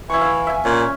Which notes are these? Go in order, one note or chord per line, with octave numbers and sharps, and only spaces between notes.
E3 E4 C#6
F5
E5 G#5
A#2 C#4